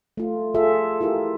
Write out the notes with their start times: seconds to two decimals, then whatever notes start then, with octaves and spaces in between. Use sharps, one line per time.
0.17 A3 F4
0.55 F4 G#4 A4 E5
1.00 E4 F4 G4 A#4